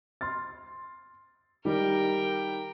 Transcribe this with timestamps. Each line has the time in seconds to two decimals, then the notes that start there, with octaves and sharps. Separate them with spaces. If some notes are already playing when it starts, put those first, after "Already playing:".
0.21 C6 F6 A6
1.65 D#3 G3 A#4 G5